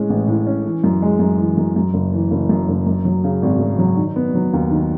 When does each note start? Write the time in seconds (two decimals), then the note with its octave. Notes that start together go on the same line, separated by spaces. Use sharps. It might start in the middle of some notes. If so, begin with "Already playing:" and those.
Already playing: A2 G#3 C#4
0.10 A1
0.27 A2
0.47 C#4
0.64 E3
0.84 F#2
1.02 G#3
1.19 F#2
1.38 E3
1.57 F#2
1.76 F#2
1.94 F#1
2.13 E3
2.31 F#1
2.49 F#2
2.68 F#1
2.86 F#2
3.05 F#3
3.24 C#3
3.42 G#1
3.60 F#2
3.79 F#3
3.97 D#3
4.16 B3
4.34 F#3
4.53 D#2
4.71 D#3